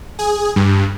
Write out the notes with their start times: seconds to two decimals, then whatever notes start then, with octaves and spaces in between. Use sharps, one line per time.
0.19 G#4
0.56 G2